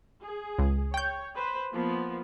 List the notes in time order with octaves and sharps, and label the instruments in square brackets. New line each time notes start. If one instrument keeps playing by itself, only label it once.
[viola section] G#4
[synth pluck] C#2
[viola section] C#5 [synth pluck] G5 G6
[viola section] B4 C5
F3 A#3 B3